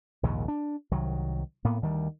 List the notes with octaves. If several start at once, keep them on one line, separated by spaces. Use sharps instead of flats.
A#1 D#2 G#2 C#3
D4
C2 D#3 F#3
A2 A#3 B3
D2 D#3 G3